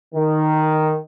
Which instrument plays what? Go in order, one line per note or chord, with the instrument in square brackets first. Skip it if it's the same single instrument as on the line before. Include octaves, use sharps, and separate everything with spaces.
[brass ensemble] D#3